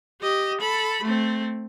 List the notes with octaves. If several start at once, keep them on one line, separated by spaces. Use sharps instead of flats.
G4 D#5
A4 B5
A3 C4